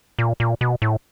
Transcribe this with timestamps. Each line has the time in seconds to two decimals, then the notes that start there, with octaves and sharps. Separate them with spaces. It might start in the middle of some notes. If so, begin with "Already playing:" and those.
0.19 A#2
0.40 A#2
0.61 B2
0.82 A2